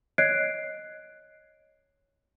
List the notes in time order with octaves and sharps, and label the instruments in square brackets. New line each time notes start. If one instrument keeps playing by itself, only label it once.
[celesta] C#5 D#5 F#6 G#6 C7 D7